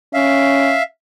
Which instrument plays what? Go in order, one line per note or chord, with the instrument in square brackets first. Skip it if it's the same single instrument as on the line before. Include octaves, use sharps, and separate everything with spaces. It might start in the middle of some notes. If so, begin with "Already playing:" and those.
[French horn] C#4 [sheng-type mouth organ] E5 F5